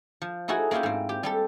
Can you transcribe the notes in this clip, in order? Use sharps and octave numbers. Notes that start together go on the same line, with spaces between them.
F3
D#4 E4 F#4 G#4 A4
A#3 C#4 E4 F4 G4
G#2 C4
G4
G3 G4 A4